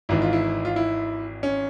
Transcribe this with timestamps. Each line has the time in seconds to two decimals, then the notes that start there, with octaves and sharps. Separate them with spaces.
0.09 G#1 G#2 E3 E4
0.22 F4
0.33 E4
0.65 F4
0.76 E4
1.43 C#4